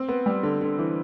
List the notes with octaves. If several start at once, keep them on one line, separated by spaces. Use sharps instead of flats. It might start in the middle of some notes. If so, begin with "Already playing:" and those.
Already playing: C4
B3
G3
D3
D3
E3